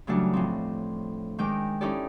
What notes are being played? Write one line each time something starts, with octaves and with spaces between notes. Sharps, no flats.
C#3 E3 F#3 G3 A3 D4
A2 F3 C4
D#3 G#3 G5 D6
C#4 D#4 E4 G4 A4 D5